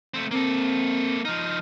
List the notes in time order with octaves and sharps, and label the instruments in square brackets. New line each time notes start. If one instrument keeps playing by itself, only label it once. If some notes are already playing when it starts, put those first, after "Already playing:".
[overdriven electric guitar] A3 C4
[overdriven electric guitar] A#3 A4 [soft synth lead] C4
[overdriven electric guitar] F3 D#4 [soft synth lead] F6